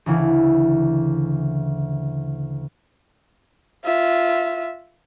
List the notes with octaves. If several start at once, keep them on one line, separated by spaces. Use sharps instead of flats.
D2 C#3 E3
F4 E5